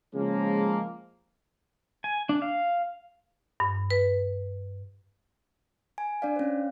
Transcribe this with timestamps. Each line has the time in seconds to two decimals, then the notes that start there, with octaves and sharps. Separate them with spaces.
0.15 C#3 F3 G#3 A#3
2.04 G#5
2.29 D4
2.42 F5
3.60 G2
3.90 B4
5.98 G#5
6.22 D4 D5 F5
6.36 C#4 C5